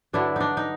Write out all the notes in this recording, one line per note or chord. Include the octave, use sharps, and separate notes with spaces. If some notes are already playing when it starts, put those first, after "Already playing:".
G2 D3 F#3 D4 E4
D4 D#4
D#4